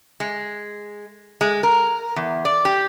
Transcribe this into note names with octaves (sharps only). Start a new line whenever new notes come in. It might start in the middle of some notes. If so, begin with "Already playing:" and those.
G#3
G#3
A#4
E2
D5
G4